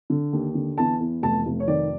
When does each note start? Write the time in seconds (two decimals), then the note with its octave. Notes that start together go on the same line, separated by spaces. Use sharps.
0.10 D3
0.33 D#2
0.55 D3
0.78 E2 A5
1.00 E2
1.23 F1 A5
1.46 F1
1.60 C#5
1.68 D#3 D5